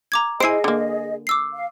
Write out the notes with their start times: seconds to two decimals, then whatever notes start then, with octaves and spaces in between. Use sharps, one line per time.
0.12 A#5 D6 G#6
0.40 E4 G#4 C5 D#5 G#5 C7 D7
0.64 D3 A#3
1.27 D6 E6 C7
1.53 F5